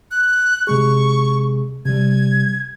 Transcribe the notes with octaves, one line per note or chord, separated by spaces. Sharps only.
F#6
C3 G#3 G#4 C#6
C3 G3 G#6